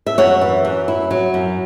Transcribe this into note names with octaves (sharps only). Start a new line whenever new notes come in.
E5
F#2 C#5 F#5
E3
F#2
E4
F#3
F#2